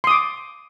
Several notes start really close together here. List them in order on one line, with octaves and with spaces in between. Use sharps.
C6 D#6 D6